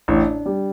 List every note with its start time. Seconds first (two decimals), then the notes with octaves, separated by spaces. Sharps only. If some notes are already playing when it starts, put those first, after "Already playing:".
0.08 A1 A2 D4
0.46 G3